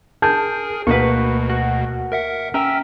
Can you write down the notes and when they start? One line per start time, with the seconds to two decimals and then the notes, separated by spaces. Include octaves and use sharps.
0.22 G#4 A#4 G#5 A5 G6
0.87 D2 B2 A#3 B4 F#5 C#6
1.49 F#4
2.12 A#4 E5 F#5
2.54 C#4 A#4 E5 G5